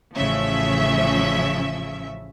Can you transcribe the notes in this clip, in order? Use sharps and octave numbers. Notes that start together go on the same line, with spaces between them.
A1 C#3 F3 C#4 E5